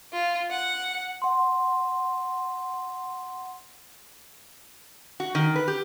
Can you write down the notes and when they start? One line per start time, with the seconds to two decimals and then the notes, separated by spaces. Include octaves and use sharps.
0.13 F4
0.51 F#5
1.22 F#5 C6
5.20 F#4
5.35 D#3
5.56 B4
5.68 G4